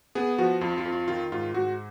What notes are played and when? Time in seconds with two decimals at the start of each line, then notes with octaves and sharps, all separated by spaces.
0.15 B3 G#4
0.38 F3 F#4
0.61 F2 F4
0.78 F4
0.85 F2
0.92 F4
1.08 D#3 F4
1.32 G#2 F4
1.54 G#2 F#4